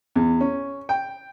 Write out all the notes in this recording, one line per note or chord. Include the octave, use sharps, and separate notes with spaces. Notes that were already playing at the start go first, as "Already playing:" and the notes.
E2
C#4
G5